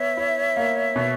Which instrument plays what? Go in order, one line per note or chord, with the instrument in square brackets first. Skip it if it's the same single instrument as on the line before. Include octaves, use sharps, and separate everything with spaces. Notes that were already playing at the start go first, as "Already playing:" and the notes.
Already playing: [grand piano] B3 [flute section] C#5 E5
[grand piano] E4
A#3
B2